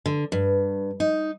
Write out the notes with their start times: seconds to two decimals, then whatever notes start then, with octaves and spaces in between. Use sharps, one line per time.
0.06 D3
0.32 G2
1.00 D#4